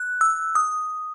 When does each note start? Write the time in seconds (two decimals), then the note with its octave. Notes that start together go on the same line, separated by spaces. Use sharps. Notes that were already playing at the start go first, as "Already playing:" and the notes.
Already playing: F#6
0.21 E6
0.55 D#6